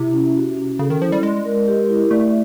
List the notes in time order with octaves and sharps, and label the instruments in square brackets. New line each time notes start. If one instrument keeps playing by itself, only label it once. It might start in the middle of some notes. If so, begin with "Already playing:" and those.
Already playing: [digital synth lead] C3 [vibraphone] E4
[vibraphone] C#4
F#4
C#4
[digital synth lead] C#3 [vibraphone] A4
[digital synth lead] D#3
[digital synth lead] F3 [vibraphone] E4
[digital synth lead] G3
[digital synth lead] G#3 [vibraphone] D5
[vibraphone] A#4
G4
E4
[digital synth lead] A3 [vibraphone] D5